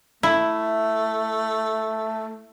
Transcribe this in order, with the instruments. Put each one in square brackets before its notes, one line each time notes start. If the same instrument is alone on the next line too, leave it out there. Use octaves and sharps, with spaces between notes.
[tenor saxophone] A3 [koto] E4